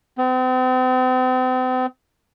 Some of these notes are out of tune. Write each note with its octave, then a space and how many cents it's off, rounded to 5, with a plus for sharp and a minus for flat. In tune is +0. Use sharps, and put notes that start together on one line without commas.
C4 -40